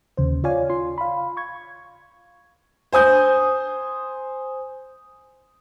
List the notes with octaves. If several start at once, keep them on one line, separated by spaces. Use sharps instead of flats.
D#2 C#3 C5
F4 C#5 D5 F5 G#5
F4 C6
F5 B5
C#6 G#6
C5 G#5 D#6 G6